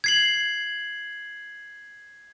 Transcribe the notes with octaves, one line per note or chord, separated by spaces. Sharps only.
G#6 C7 F#7